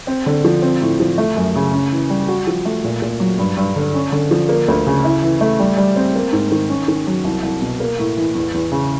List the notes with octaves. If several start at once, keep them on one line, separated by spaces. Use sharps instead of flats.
C4
D3
F3
C4
A2
F3
A3
F#2
C#3
C#4
E3
G3
F#4
F3
A3
A#2
A#2
F#3
G2
G2
D3
C#4
D3
F3
A#3
D2
C#3
E4
E3
A3
G3
G3
C4
A#3
G#2
D#3
C#4
D#3
F#3
C2
C2
B2
A#3
A2
E3
E2
E2
C#3